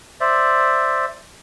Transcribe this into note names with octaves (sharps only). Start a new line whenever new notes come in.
C5 D5 E5